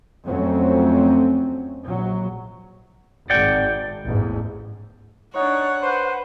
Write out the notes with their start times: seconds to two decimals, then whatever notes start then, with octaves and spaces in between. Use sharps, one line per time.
0.25 F2 F#3 A3 C4 C#4
1.85 A#1 F#3
3.30 G#1 D5 F#5 G5
4.06 A1 E2 G#2
5.35 D4 D#4 C#5 F#5
5.82 B4 C5